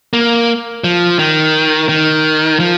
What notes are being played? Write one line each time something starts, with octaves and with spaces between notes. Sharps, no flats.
A#3
F3
D#3
D#3
F3